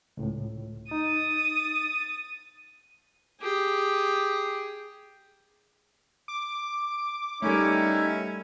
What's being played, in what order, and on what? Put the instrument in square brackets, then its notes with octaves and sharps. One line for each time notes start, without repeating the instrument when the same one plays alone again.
[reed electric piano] C#2 A2
[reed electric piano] D#4 [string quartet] D#6 A6
[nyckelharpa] G4 G#4
[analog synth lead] D6
[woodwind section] D#3 D#4 E4 [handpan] G3 A3 [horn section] C#4